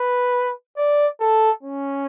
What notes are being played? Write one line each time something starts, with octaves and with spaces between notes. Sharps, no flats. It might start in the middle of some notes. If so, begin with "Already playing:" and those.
Already playing: B4
D5
A4
C#4